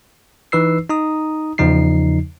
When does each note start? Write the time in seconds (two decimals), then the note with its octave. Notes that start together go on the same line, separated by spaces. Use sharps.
0.52 E3 D#4 B4 E6 C7
0.89 D#4 A#5 D#6
1.58 E2 C#3 F3 D#4 C7